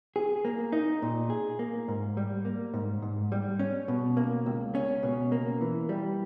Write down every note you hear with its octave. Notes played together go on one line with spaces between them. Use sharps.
G#4
A#3
D#4
A#2
G#4
A#3
G#2
G3
A#3
G#2
G#2
G3
C#4
B2
A#3
C#2
C#4
B2
A#3
E3
G3